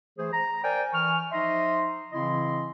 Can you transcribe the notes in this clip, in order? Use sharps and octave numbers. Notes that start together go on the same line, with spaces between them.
E3 A3 G#4 C5
A#5
A#4 C5 D5 G5 G#5
E3 G#5 C#6 F6
F3 D#4 D#5 E5 C6
C#3 E3 C4 E4 D#5 C6